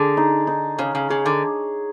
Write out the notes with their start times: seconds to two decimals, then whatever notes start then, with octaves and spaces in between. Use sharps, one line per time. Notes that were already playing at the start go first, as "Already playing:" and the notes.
Already playing: D3 G#4
0.17 D#4
0.47 D#4
0.78 C#3 C#5
0.95 C#3
1.10 C#3 G#4
1.26 D3